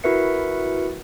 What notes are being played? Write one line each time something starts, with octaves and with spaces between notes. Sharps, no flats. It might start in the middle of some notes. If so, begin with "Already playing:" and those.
E4 F#4 A#4 B4 E5 C#7